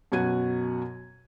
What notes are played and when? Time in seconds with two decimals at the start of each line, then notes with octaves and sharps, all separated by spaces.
0.12 F#2 B2 F#4 F#5 G#6 D#7